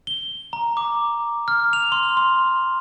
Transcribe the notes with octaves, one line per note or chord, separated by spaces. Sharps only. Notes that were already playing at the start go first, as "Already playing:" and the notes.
G7
A#5
D6
F6
F7
C6
C6